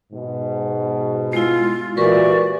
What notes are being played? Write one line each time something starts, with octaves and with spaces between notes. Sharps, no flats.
G#2 B2
G#3 E4 F4
A#2 E3 F#4 G4 A#4 B4 D5